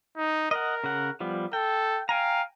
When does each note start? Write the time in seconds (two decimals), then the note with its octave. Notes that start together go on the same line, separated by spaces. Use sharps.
0.17 D#4
0.51 A#4 D#5 F#5
0.84 C#3 F#5
1.20 F3 G3 B3
1.53 A4 G5
2.09 F5 G5 G#5 A#5